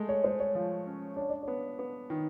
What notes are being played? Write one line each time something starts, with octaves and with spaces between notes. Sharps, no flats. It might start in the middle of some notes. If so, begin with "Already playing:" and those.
Already playing: G#3 A3
C#5
G#3 C5
C#5
F3
C#4
D4 C#5
D5
B3 C#5
B3
D#3